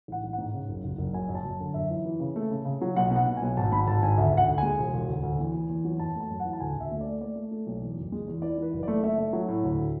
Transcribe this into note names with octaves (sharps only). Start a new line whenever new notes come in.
A1 F#5
A1
G#2 F#5
C#3
F#1
F#1
F#1
F#2 G#5
F#2
A5
F#2
D3
F#2 E5
E3
E3
C#3
A3
C#3
C#3
F#3
B1 F#5
B2
F#5
B2
G#5
B1
G#1 A5
G#2 B5
G#1 A5
G#2 G#5
D2 E5
D2
F#5
D2
G#3 G#5
E1
E1
D2
D2
E2
E2
E2
F#3
F#2 A5
A3 A5
F#2
F#5
E3
A5
D2 G#5
D2 E5
A3
D5
A3
A3 D5
A3
A3
B1
E2
F#1
G#3
E2
E3 D5
E3 B4
F#1
A3 D5
A3 E5
A3
F#3
A2
D2